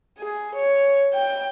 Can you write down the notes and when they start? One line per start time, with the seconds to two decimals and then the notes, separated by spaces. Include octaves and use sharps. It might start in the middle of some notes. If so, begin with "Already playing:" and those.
0.19 G#4
0.55 C#5
1.14 G5